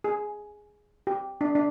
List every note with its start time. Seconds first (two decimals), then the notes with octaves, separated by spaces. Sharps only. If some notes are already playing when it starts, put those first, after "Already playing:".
0.04 G#4
1.07 G4
1.41 D4
1.55 D4